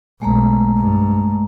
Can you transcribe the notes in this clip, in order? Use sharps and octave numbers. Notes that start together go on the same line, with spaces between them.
B1 G#3 A3 A#5
G2